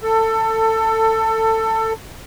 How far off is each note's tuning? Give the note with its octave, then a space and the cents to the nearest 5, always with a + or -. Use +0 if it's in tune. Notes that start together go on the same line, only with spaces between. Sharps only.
A4 +20